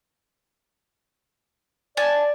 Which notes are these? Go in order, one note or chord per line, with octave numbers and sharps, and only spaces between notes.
D5 G#5 A5